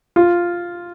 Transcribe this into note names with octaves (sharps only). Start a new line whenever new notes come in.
F4